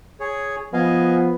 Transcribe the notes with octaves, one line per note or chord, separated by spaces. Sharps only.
G#4 C#5
F3 B3 D#5 F5 G#5